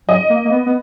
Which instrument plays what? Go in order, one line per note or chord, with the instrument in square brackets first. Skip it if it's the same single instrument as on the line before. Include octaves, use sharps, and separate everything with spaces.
[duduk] F#3 [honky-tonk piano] D#5
[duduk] A#3
A#3
B3
B3